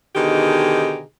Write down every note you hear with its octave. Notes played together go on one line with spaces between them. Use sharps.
B2 D3 D#3 D#4 G4 G#4